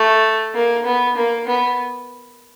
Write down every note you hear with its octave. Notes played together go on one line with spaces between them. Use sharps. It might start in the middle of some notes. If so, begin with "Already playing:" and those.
Already playing: A3
A#3
B3
A#3
B3